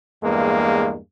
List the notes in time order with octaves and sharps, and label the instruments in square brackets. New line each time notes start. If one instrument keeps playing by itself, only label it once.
[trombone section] E2 G2 G#3 A#3